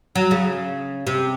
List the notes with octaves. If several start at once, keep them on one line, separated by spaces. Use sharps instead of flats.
F#3
C#3
C3